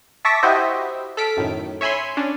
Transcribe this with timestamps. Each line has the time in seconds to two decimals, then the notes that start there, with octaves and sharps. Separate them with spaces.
0.25 E5 A5 C#6 D6 A#6 B6
0.43 E4 F#4 G4 C5 D#5 E5
1.17 A4 F6 B6 D7
1.37 F#2 A2 D#3
1.81 C#5 E5 G#5 B5 C6
2.17 C#4 D4